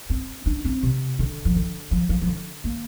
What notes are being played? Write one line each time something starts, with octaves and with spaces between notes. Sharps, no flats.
C4
D4
C4
C3
D3
F3
D3
F3
F3
F3
D3
A#3